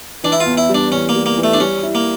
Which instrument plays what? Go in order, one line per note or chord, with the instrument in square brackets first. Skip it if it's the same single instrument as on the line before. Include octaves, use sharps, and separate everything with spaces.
[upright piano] E3 [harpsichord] D4
[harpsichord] E4
F4
[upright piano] E2
[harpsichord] E4
[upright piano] G3
[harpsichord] D4
[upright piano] E2 [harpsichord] C#4
[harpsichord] A#3
[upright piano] G3
[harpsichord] A#3
[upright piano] E3
[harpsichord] A3
D4
[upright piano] G3 [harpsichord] C#4
[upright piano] E4
[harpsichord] A#3